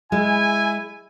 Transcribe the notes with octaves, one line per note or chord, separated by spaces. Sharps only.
G#3 E4 G#5